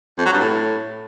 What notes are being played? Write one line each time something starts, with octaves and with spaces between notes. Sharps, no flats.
F2
F#3
G2
A2